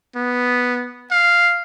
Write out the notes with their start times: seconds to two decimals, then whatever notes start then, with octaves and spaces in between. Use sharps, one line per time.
0.16 B3
1.11 F5